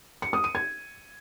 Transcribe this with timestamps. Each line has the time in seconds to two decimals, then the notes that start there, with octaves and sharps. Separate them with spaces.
0.22 C#7
0.33 D#6
0.44 D#7
0.55 G#6